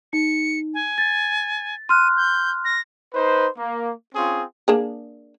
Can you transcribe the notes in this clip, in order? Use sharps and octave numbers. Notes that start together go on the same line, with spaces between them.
D#4 C#7
G#5
A6
C6 F6 F#6 D#7
G6
A#6
D#4 B4 C5
A#3
C4 C#4 F4 G#4
A#3 D4 G#4